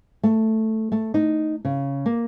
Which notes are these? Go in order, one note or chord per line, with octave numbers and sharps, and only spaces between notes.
A3
A3
D#4
C#3
A#3